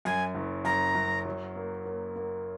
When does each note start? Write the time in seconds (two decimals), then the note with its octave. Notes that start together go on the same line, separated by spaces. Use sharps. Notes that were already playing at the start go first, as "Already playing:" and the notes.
0.05 F#2 G#5
0.35 F#1
0.65 F#2 A#5
0.95 F#2
1.25 F#3
1.56 A#3
1.85 A#3
2.16 A#3